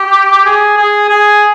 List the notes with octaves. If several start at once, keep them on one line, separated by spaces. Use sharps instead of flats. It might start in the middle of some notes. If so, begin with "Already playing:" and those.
Already playing: G4
G#4
G#4
G#4